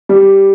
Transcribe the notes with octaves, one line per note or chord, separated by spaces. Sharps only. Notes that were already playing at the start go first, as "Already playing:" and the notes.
G3